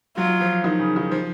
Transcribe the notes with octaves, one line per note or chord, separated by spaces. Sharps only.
F#3 F4
F3
D#3
C#3
D#3
F3